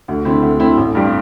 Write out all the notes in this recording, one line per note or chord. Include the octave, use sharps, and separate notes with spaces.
D2
D3 C4 E4
D2
D3 C4 E4
A1
G2 G3 C4